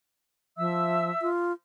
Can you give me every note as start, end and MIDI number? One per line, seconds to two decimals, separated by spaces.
0.58 1.11 53
0.58 1.28 76
0.58 1.28 88
1.22 1.53 65